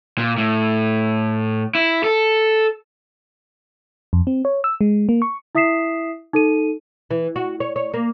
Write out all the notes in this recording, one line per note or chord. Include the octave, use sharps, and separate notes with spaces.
A#2
A2
E4
A4
F2
C4
C#5
E6
G#3
A#3
C#6
E4 E5 D#6 B6 C7 E7
D#4 A4 D#7
E3
F#4
C#5
C#5
A#3